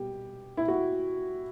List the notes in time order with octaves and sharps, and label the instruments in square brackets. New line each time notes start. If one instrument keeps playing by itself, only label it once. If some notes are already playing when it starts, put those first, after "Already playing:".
Already playing: [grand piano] B2 G3 B3 G4
E4
F#4